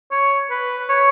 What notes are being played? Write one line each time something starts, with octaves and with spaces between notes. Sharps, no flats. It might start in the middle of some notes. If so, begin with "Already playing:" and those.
C#5
B4
C#5